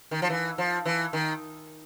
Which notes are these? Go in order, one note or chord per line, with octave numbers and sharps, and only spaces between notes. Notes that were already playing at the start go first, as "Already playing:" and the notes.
D#3
F3
E3
F3
E3
D#3